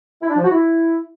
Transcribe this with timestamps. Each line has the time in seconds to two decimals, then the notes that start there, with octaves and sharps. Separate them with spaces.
0.22 E4
0.29 D4
0.37 F3
0.44 F#4
0.51 E4